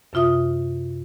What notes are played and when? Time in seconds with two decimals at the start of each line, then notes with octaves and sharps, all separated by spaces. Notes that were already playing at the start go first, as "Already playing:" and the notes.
0.13 F#2 C3 F4 E5 D#6